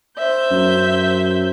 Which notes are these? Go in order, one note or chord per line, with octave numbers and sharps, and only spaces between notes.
C5 E5 G6
F#2